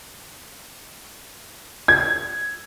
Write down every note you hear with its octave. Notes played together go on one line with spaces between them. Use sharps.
G#6